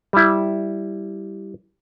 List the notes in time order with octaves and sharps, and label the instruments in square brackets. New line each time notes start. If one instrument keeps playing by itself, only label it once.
[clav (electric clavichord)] G3 E4